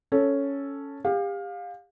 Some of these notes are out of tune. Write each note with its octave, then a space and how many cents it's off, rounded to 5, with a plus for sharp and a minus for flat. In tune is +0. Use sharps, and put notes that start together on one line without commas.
C#4 +5 A4 +0
G4 +35 F5 +20